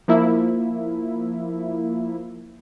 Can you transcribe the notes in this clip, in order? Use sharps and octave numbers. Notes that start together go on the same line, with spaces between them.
F3 A#3 E4